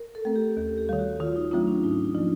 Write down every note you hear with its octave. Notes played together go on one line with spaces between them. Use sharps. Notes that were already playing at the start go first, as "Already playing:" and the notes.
Already playing: A#4
A4
A3 C4
G4
D#2
G4
D#3 G3
F#4
D#3 F4
D#4
F#3 A3 C4 D4 F4
C#4
G#2 D#4
D#4
F3 A#3